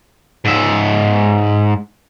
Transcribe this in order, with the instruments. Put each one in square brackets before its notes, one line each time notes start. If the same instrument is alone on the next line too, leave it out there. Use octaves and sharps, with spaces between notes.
[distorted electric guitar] G#2 E5